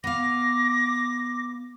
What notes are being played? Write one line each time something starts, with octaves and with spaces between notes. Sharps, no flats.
B3 F5 D6 A#6